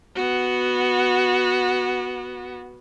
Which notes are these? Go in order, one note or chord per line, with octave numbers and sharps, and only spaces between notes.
B3 F#4